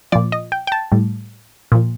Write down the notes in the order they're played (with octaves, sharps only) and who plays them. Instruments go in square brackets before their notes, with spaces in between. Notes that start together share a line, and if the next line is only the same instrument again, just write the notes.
[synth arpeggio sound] A#2 F3 D5
D#5
G5
G5
A5
A2 G3
A#2 F3